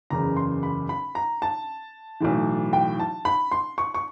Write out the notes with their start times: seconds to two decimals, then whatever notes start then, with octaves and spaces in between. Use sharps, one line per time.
0.10 F#1 E2 C#3 A#5
0.37 C6
0.63 B5
0.89 B5
1.15 A#5
1.42 A5
2.20 B1 A2 E3
2.73 G5
3.00 A5
3.25 B5
3.52 C6
3.78 C#6
3.94 C#6